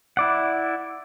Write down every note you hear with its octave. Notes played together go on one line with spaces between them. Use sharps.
E4 D5 F#5